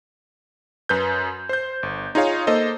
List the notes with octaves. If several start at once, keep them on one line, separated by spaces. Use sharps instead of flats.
F#2 B4 G6
C5 G6
G1
D#4 F4 G#4 C#5 F5
A#3 A4 C5 D#5